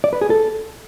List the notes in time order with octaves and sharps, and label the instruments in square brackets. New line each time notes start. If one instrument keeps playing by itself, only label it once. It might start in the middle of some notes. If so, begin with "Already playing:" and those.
[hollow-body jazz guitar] D5
B4
G#4
A4